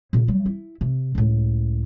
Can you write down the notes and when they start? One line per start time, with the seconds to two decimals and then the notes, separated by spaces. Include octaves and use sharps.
0.13 A#2 C#3
0.28 F#3 G3
0.46 E4
0.81 C3
1.15 C#2 A2